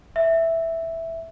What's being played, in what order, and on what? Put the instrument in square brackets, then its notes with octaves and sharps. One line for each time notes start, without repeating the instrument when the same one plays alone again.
[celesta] E5